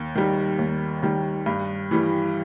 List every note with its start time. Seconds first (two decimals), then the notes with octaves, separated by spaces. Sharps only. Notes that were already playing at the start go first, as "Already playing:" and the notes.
Already playing: D#2
0.15 D#3 G3
0.59 D#2
1.03 D#3 G3
1.46 G2
1.91 E3 G3